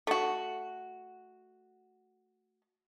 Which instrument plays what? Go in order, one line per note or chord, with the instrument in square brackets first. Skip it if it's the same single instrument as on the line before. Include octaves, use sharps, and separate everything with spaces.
[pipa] A3 F#4